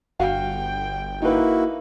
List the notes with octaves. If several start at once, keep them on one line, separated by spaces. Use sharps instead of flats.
G1 F#4 F5 G5
A#3 D#4 E4 F#4 B4